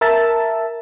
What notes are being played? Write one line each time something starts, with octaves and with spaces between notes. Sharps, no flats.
A#4 E5 A5